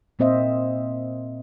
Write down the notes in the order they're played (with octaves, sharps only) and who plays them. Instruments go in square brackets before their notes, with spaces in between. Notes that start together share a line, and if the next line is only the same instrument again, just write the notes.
[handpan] A#2 A#3 C4 C5 D#5 E5